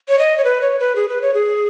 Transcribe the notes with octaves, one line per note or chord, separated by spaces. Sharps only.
C#5
D#5
C#5
B4
C#5
B4
G#4
B4
C#5
G#4